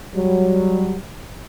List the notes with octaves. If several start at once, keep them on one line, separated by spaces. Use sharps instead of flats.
F#3 G3